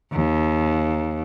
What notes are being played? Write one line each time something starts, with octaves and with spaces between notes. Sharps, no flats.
D#2